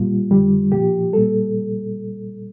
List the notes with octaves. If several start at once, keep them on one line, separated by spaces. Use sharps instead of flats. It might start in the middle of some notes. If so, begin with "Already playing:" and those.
Already playing: A#2 G3 F4
F2 D3 G3
A#2 F3 G4
A#2 G3 A4